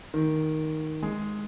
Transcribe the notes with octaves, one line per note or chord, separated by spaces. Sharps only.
D#3
G#3